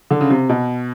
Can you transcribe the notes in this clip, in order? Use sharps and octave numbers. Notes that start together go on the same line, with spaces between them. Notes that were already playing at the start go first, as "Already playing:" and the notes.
D3
C#3
C3
B2